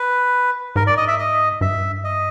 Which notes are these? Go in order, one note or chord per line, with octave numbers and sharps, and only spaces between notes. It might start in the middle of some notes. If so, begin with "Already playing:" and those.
Already playing: B4
G#2 A#4
D5
D#5
E5
D#5
G2 E5
D#5